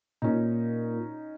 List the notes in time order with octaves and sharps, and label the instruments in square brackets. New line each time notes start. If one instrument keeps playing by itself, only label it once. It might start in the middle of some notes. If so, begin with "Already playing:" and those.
[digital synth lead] A#2 [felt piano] C#4 D#4